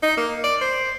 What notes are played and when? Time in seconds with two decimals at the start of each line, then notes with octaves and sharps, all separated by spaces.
0.03 D#4
0.18 A#3
0.44 D5
0.61 C5